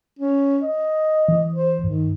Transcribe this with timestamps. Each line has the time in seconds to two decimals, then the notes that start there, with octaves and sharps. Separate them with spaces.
0.19 C#4
0.62 D#5
1.29 E3
1.54 C5
1.84 G2 D#3